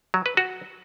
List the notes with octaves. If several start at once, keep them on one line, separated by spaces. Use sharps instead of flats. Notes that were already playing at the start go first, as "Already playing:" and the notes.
F#3
B4
F#4